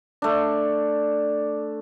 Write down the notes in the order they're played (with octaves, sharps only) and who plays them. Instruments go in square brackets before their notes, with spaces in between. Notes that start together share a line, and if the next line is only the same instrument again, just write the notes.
[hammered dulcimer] A3 D4